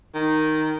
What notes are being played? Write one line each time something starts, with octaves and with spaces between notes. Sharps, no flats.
D#3